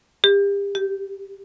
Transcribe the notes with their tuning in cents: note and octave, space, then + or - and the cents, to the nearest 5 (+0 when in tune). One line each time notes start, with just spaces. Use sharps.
G4 +35
G4 -10